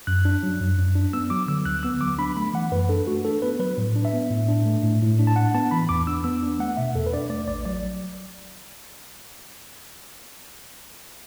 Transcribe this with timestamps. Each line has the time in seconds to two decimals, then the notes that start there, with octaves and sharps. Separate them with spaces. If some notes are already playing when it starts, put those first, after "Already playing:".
0.07 F#2 F#6
0.25 D4
0.43 F#3
0.60 F#2
0.78 F#2
0.95 D4
1.13 B3 E6
1.30 F#3 D6
1.48 D3 E6
1.65 D2 F#6
1.83 B3 E6
2.01 F#3 D6
2.18 D4 B5
2.37 A3 B5
2.54 E3 F#5
2.72 F#2 B4
2.89 D4 A4
3.07 A3 F#4
3.25 D4 A4
3.42 B3 B4
3.60 F#3 B4
3.77 A2
3.96 D4
4.05 E5
4.14 B3
4.30 A2
4.48 D4
4.65 A3
4.83 A2
5.02 A2
5.19 D4
5.27 A5
5.36 D4 F#5
5.54 B3 A5
5.71 E3 B5
5.89 E2 D6
6.07 D4 E6
6.24 B3 E6
6.43 D4
6.59 A3 F#5
6.77 B2 E5
6.95 E2 A4
7.06 B4
7.13 D4 D5
7.30 A3 D5
7.48 A1 D5
7.65 F#3 D5